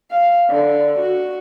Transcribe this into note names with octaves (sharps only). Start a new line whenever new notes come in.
F5
D3
F#4